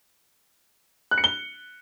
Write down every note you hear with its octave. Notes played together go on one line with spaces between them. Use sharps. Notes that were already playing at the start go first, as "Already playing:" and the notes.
F#6
C#7
G7